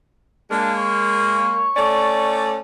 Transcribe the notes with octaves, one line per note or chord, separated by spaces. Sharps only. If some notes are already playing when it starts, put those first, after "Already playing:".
G#3 A#3 D4
C#5
A3 C#4 D5